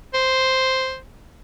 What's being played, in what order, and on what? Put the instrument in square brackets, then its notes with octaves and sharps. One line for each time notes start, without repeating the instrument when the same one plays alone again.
[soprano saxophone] C5